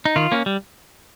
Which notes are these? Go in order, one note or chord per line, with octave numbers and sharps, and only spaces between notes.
D#4
D#3 F4
A#3 C#4
G3